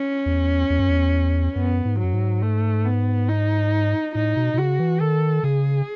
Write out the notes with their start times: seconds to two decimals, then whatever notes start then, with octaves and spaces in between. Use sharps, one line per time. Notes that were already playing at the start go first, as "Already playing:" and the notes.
Already playing: C#4
0.26 E2
0.70 E2
0.79 F#2
0.90 E2
1.56 F#2 B3
1.85 G#2
1.99 F#2 F#3
2.13 G#2
2.42 A3
2.85 B3
3.28 D#4
4.15 A2 D#4
4.37 B2
4.54 B2
4.58 C#3 F#4
4.80 E3
5.01 D#3 A4
5.43 C#3 G#4